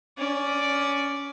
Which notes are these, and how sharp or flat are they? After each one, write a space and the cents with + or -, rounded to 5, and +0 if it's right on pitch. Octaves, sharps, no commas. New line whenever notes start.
C#4 +15 D5 +0